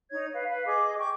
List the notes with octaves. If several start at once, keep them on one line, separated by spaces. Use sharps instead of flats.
D#4 C#5 G#6
B4 F5
B4 F5
G#4 D#5 D6
G5 C#6 D6